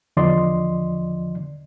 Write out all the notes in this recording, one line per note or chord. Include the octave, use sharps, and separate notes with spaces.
E2 D3 F3 D5 D#5 C6